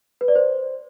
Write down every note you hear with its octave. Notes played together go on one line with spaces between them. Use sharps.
B4
D5
C5